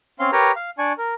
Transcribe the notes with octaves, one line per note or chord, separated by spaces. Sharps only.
C4 C#4 F5 C6
G4 A#4 B4 C#5 G5 A#5
F5
D4 D5 G#5 C#6
A#4